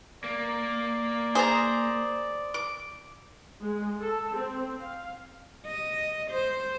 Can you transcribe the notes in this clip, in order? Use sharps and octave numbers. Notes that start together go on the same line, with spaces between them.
A#3 D5
G#4 C5 A#5
D6
G#3
A4
C4
F5
D#5
C5